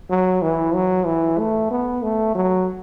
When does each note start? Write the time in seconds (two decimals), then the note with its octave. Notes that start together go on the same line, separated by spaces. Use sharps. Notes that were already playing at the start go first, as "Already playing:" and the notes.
0.10 F#3
0.42 E3
0.74 F#3
1.06 E3
1.39 A3
1.71 B3
2.03 A3
2.35 F#3